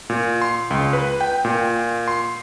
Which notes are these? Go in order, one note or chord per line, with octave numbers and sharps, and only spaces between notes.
A#2
C6
C#2
B4
G5
A#2
C6